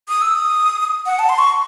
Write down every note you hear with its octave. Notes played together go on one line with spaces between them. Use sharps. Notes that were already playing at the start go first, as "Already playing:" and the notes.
D#6
E6
D#6
F#5
A5
C6
C#6